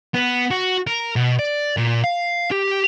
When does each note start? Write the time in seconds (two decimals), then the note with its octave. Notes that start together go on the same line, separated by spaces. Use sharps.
0.15 B3
0.51 F#4
0.87 A#4
1.16 B2
1.39 D5
1.77 A#2
2.04 F5
2.51 G4